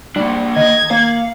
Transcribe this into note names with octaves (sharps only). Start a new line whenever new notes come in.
G3 A#3 D4
D#3 D#5 G#6
A#3 F5 A#5 C#7 F#7